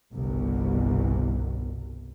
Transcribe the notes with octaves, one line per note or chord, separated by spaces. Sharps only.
G1 C2 B2